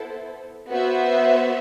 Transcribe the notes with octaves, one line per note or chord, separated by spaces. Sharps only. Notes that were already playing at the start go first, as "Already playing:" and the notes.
Already playing: B3 E4 A4 C5
B3 F#4 C5 E5